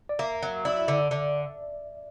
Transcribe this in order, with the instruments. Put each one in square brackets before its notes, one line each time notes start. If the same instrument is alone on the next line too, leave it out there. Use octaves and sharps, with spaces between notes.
[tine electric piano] D5
[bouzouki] A#3 [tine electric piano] E5
[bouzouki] F#3
[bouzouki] E4 [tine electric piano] D5
[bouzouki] D3
D3